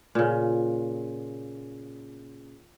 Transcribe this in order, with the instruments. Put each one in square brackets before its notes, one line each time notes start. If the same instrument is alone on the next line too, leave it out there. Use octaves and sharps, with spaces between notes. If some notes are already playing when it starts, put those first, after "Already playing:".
[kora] A#2 C#3